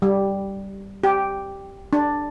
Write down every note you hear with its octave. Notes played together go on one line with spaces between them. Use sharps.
G3
G4
D4